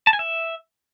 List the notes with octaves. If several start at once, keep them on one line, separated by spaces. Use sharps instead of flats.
A5
G#5
E5